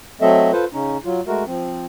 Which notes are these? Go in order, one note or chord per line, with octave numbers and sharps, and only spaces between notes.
F#3 A3 C4 A4 D#5 E5
F4 A4 B4 C5
C#3 C#4 D#4
F#3 F4
G#3 A3 F#4 A#4
F3 C4